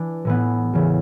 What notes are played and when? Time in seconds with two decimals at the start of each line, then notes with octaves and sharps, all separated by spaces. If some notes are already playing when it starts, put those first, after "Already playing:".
Already playing: E3 D4
0.25 A2 E3 B3
0.73 E2 C#3 E3